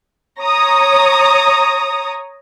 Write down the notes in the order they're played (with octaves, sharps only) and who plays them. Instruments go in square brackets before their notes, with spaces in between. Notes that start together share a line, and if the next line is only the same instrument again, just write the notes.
[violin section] C#5 A#5 D#6